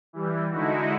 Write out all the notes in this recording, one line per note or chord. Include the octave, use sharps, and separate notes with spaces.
E3 G3
D3 G#3 D#4 E4 F#4